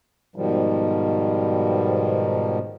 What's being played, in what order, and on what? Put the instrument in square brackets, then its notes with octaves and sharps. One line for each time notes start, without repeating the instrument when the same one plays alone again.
[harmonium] G#2 B2 D#3 F3 G3